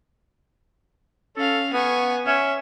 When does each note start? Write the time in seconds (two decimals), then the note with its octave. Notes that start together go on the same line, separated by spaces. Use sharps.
1.36 C#4 A4 F5
1.73 B3 G#5 C#6
2.26 C#4 E5